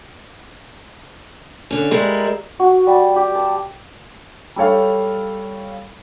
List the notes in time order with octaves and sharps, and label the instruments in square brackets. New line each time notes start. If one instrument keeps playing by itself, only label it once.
[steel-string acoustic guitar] D3 C#4
G3 G#3 E4 A#4
[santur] F#4
G3
G4
A5
[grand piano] G3 A4 C#5 F5